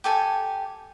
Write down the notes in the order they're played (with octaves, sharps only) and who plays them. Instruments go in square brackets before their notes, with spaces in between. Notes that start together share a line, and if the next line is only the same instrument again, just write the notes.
[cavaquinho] G4 A4 G#5